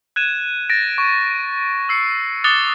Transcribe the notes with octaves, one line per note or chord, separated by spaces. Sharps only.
F#6 G#6 D#7 E7
A6 A#6 D7
C#6
E6 C7 C#7
D6 D#6 F#6 A6 C#7 G7